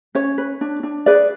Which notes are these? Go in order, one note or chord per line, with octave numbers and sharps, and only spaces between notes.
C#4 C#5
B4
D4
D4
G#4 B4 D5